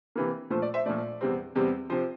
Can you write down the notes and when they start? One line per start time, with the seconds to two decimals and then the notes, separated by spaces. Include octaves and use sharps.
0.15 C3 E3 A#3
0.50 A#2 F3 A3 C5
0.62 D5
0.74 C5 E5
0.86 A#2 F3 A3 D5
1.21 E2 C3 G3 C4
1.55 E2 C3 G3 C4
1.90 C3 F3 C5